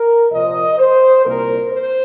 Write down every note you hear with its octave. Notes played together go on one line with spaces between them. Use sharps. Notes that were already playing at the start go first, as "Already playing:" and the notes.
Already playing: A#4
C2 A#2 F3 D#5
C5
C2 A#2 A#3 A#4
C5